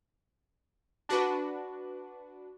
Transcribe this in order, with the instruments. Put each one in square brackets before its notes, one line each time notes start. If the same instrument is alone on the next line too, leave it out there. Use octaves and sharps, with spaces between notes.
[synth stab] D4 F#4 B4